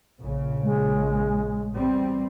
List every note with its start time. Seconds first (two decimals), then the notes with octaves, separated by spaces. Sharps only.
0.20 A#1 C#3
0.63 G#3
1.76 E2 G3 C4